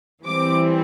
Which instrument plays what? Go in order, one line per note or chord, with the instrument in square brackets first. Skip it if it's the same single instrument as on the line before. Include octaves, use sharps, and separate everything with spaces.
[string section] E3 G3 C4 D6